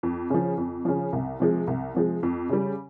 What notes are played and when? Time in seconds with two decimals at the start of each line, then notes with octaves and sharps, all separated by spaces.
0.03 F2
0.30 C#3 F3
0.58 F2
0.85 C#3 F3
1.13 C2
1.40 C3 F3 G#3
1.67 C2
1.94 C3 F3 G#3
2.23 F2
2.49 C#3 G3